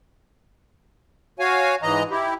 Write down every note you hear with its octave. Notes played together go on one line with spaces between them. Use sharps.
F#4 C#5 F5 G#5
G#2 E3 D#5 A#5
E4 G4